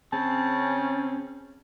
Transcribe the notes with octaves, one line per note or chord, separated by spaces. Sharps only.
C#3 C4 C#4 A5